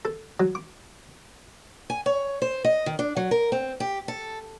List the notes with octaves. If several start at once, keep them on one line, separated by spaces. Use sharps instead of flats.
A4
F#3
D6
G#5
C#5
C5
D#5
D#3
D4
F#3
A#4
C4
G4
A4